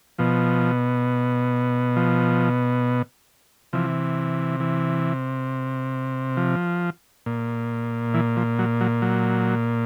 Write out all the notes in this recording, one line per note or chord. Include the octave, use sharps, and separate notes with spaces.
B2 F3
F3
C3 E3 F3
E3
F3
A#2
E3
F3
F#3
F#3
F#3